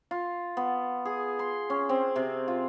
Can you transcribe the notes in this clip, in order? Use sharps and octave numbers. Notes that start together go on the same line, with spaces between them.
F4
B3
G#4
C6
C#4
C4
C3
F4